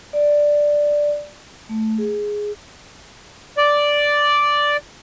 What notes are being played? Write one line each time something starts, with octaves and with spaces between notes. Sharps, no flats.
D5
A3
G#4
D5